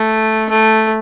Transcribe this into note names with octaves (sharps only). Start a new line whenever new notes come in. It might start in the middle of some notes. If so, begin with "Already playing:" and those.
Already playing: A3
A3